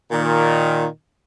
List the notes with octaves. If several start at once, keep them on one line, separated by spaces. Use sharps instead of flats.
A#2 D#3